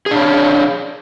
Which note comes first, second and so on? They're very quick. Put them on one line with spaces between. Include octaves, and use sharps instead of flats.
G#4 D4 C#5 F5